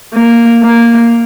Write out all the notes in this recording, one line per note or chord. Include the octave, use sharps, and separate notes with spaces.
A#3
A#3